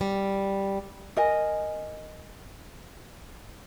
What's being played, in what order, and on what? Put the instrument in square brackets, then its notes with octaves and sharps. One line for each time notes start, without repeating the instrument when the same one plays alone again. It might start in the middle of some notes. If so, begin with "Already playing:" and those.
[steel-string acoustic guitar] G3
[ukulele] A#4 D#5 G#5